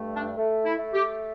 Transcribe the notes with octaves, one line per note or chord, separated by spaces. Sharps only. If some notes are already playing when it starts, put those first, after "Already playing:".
Already playing: G2 A3
D4
A3
E4
A3
G4